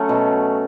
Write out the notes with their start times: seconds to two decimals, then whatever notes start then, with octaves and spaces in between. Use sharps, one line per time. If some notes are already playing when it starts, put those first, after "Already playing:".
Already playing: F#3 A3 C#4
0.09 B2